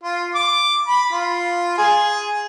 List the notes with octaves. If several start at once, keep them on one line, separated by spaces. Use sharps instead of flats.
F4
D6
B5
F4
G#4